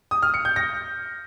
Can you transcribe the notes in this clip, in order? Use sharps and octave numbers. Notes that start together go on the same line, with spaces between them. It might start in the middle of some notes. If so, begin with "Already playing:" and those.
D#6
F6
C#7
G6
A#6